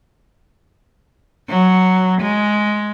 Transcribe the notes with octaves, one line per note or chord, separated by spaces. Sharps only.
F#3
G#3